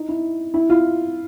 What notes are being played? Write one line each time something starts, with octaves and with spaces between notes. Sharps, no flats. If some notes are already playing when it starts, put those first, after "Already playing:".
Already playing: D#4
E4
E4
F4